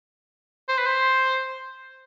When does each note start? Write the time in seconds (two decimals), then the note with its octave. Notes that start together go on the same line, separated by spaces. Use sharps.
0.69 C5
0.78 B4
0.86 C5